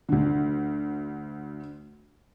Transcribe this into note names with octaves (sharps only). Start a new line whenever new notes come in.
D2 D3